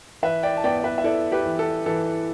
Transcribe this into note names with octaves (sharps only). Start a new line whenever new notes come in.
E3 B4 E5
D5 G5
A5
B3 D5 G5
D5
B4 E5
E5
E4 A4 D5
G4 B4
E3
A4
E3 A4